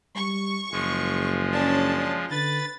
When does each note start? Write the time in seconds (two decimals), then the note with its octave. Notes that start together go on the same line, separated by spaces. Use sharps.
0.16 G3 C#6
0.72 F#1 F3 G#3
1.52 C#4 D4 A5
2.31 D3 B4 A6